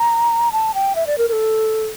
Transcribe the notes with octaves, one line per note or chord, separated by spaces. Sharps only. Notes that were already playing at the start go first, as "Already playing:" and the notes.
Already playing: A#5
A5
G5
E5
D5
A#4
A#4
A4